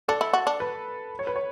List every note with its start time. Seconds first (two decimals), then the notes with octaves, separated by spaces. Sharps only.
0.08 D4 A4
0.21 E4
0.33 F#4
0.47 D4
0.60 B4
1.19 C#5
1.27 B4
1.36 C#5